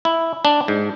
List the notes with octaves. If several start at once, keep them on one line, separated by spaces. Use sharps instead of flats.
E4
D4
G#2